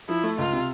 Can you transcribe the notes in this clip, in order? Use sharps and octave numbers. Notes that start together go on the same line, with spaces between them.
F3 E4
A3
C#2 F4
C3